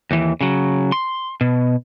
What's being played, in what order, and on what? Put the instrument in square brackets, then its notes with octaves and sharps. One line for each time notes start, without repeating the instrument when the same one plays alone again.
[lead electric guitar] D#2 E3
C#3 F#3
C6
B2